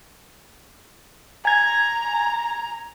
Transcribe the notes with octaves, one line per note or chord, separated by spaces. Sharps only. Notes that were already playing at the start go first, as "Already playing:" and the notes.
G#5 A#5 G#6